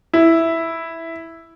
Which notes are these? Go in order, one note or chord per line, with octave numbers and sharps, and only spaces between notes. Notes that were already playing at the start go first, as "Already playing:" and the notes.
E4